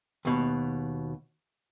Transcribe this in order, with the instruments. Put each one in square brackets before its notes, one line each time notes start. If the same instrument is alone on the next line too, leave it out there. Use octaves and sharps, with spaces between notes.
[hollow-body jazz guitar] D#2 B2